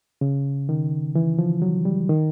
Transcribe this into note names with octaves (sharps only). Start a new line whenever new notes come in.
C#3
D#3
E3
F3
F#3
G3
D#3